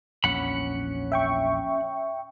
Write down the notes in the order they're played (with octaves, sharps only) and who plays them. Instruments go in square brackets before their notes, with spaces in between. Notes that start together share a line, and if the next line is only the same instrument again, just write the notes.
[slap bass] A#1 E2 [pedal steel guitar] C#4 F#5 B5
[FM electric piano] E5 G5 C#6